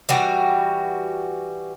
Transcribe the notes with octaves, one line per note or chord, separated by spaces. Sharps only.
E3 G3 F#4